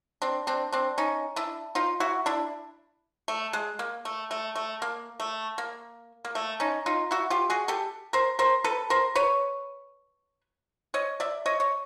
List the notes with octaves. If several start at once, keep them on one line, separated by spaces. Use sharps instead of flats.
C4 D4
C4 D4
C4 D4
C#4 D#4
D4 E4
D#4 F4
E4 F#4
D4 E4
A3
G#3
A#3
A3
A3
A3
A#3
A3
A#3
A#3
A3
C#4 D#4
D#4 F4
E4 F#4
F4 G4
F#4 G#4
G4 A4
A#4 C5
A#4 C5
A4 B4
A#4 C5
B4 C#5
C#5 D#5
D5 E5
C#5 D#5
C#5